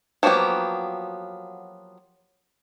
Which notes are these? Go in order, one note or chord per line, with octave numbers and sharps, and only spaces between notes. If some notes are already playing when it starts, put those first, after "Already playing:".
F3 F#3 A#3 B3 G4